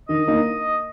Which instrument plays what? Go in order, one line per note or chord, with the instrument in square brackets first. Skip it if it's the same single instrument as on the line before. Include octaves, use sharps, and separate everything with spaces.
[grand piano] D#3 [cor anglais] D#5
[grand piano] A#3 D#4